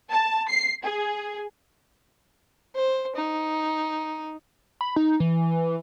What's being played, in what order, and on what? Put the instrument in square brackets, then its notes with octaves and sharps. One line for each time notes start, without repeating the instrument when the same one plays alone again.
[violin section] A5
C7
G#4
[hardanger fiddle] C5
D#4
[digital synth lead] B5
D#4
E3